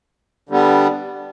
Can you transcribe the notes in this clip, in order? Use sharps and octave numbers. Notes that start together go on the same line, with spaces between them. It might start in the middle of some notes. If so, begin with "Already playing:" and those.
D3 G3 B3